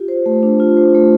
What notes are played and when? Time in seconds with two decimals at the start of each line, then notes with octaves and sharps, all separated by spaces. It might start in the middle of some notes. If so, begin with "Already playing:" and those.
Already playing: F4 G4
0.08 C5
0.26 A3
0.43 D4
0.60 F4
0.77 C5
0.94 A3